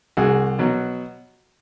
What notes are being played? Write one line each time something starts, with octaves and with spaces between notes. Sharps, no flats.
C2 F#4 G#4
B2 F#3